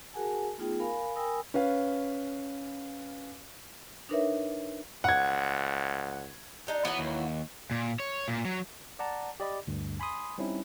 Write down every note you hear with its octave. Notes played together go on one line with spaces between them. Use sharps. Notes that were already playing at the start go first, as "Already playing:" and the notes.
F#4 G#4 A#4 F#5 G#5 A5
A3 B3 D#4 F4 G#4 G5
A#4 F5 G#5 B5
A#4 G5 G#5 B5 D#6 E6
C#4 B4 F5
D4 D#4 A#4 B4 C#5 E5
C#2 F#5 G#6
D4 D#4 G4
E3 F#3 B3 E4
D#2
A#2
C#5
A#2
F#3
D5 F#5 A5 A#5
G4 D5 D#5 B5
D2 G2
G#5 B5 C6 D#6
G3 C4 C#4 D#4 E4